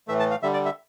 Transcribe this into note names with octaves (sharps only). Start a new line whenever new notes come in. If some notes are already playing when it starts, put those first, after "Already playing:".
A2 E3 A3 E5
A5
F5
D3 G3 E5
D5
E5